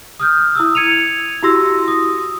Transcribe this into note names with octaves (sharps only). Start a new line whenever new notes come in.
D#6 F6 G6
E4 D#6 E6
G#6 C#7 D#7 F7
E4 F#4 G4 C6 E6 A#6
D#6